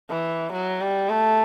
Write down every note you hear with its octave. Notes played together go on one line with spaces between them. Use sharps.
E3
F#3
G3
A3